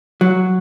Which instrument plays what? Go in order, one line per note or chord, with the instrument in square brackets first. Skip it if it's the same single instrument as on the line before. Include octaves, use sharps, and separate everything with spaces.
[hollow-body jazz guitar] F#3